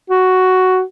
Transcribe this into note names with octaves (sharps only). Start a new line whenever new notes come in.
F#4